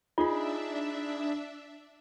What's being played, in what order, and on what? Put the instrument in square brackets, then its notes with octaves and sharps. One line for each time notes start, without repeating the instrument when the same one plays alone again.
[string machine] D4 E5 [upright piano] D#4 G#4 B5 [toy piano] F4